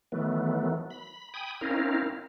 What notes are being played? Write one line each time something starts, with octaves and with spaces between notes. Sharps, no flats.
D#3 E3 F#3 A3 B3
B5
G5 G#5 B5 D#6
C4 C#4 D#4 E4 A#4 F5